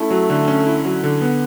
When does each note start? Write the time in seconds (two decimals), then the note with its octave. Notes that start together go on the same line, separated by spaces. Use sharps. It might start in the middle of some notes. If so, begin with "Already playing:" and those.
Already playing: A3 C#4 E4
0.10 F#3
0.30 D3
0.47 C#4
0.67 E4
0.85 F#3
1.04 D3
1.21 B3